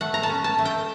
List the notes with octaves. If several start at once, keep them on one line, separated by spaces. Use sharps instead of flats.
A3 F#5
A#5
A5
C#4
A5
A3
G5